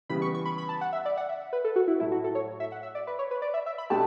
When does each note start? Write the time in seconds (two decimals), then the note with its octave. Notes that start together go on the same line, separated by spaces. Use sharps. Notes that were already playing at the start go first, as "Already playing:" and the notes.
0.09 C#3 E3 G3 B3 B5
0.22 C#6
0.34 C#6
0.45 B5
0.58 B5
0.69 A5
0.81 F#5
0.93 E5
1.05 D5
1.17 F#5
1.29 E5
1.53 B4
1.64 A4
1.76 F#4
1.88 E4
2.00 A2 F#3 A3 E4
2.12 F#4
2.24 A4
2.35 C#5
2.60 E5
2.72 F#5
2.83 E5
2.95 D5
3.07 B4
3.19 C#5
3.31 B4
3.42 D5
3.54 E5
3.66 E5
3.78 B5
3.90 B2 A3 D4 G4 A5